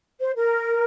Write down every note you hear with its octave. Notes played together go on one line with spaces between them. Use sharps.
C5
A#4